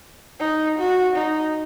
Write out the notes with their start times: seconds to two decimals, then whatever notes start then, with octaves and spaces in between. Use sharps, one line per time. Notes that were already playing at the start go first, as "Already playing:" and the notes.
0.40 D#4
0.78 F#4
1.16 D#4